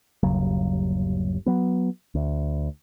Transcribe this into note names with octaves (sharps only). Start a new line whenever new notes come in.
G1 D#2 C#3 F#3
F#3 B3
D2